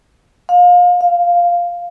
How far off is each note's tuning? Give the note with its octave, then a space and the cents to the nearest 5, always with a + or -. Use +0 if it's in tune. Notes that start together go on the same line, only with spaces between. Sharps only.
F5 +30
F5 +0